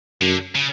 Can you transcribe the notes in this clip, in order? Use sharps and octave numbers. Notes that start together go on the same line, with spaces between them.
F#2 D3
C#3